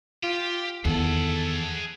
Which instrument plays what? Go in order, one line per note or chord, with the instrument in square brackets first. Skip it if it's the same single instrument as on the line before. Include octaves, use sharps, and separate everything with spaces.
[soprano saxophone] F4 [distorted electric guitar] G4
[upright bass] E2 [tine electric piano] D#3 B3 [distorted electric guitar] G#4 F#5 [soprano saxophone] A4